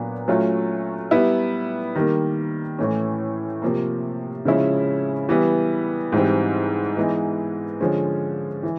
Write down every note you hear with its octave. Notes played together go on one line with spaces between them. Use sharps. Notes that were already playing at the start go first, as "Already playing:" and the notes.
Already playing: A#2 F#3 B3 D4 F#4
F#3 A3 C#4 F4
G3 B3 E4
D#3 G3 A#3
A2 E3 A3 C#4
C3 F3 A#3
C#3 F3 G#3 C#4 E4
E3 G3 B3
G#2 E3 G3 C4
E3 G#3 B3 D#4
D3 F3 G#3 C#4
E3